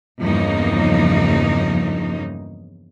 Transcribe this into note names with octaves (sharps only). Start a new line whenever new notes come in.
E2 G2 C#3 F3 A#3 D#4